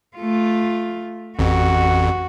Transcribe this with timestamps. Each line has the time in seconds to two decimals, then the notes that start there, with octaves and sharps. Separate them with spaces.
0.17 A3 F4
1.39 A1 F2 F#4